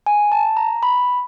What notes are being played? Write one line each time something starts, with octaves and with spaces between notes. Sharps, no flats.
G#5
A5
A#5
B5